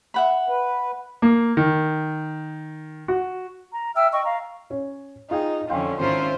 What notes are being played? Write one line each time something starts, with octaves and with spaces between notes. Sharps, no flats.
E5 F#5 B5
B4
A#3
D#3
F#4
A#5
E5 G5 E6 F6
D#5 G5 C#6
F5 A#5
C#4 C#5
D#4 F4 G#4 G5
F2 D3 C#4 F5 G5 C6
G#1 C#4 E4 F4 C5 A#5